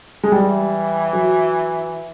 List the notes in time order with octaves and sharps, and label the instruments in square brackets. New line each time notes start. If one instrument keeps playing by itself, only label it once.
[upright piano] G#3
[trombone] E3 [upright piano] G3
[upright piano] F#3